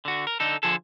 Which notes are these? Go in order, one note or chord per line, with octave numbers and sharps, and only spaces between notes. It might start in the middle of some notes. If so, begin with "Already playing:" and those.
D3 F#4
A#4
D3 D#4 A4
D3 F3 G#4 A4